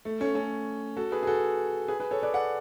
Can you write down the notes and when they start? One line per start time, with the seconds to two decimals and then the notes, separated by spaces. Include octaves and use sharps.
0.05 A3
0.20 A3 C#4
0.35 A3 C#4
0.97 F#4 A4
1.12 G#4 B4
1.23 G#4
1.27 F#4 A4
1.88 G#4 B4
2.00 G#4 B4
2.11 A4 C#5
2.23 B4 D5
2.34 D5 F#5